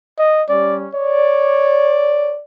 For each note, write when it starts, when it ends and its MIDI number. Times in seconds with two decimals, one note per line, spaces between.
0.19 0.43 75
0.49 0.86 55
0.49 0.86 61
0.49 0.78 74
0.95 2.35 73
0.95 2.41 74